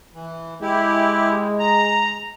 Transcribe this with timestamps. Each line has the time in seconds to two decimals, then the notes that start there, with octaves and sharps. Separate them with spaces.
0.14 E3
0.62 G#3 E4 G4
1.59 A#5